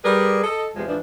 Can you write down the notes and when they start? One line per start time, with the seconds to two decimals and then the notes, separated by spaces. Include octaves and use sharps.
0.03 G3 G#4 A#4 B4 D5
0.43 A4 D#5
0.76 E2 C3 F3 G#3
0.88 G#2 E3 F3 D4